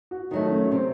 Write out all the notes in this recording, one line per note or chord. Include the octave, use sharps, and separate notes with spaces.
F#4
D#3 F#3 A3 D#4
C#4
C3 C4